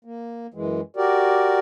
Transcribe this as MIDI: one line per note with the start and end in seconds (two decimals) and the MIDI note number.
0.05 0.47 58
0.54 0.81 42
0.54 0.81 52
0.54 0.81 56
0.96 1.59 66
0.96 1.59 67
0.96 1.59 70
0.96 1.59 74